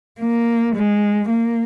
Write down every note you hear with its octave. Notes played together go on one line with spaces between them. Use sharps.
A#3
G#3
A#3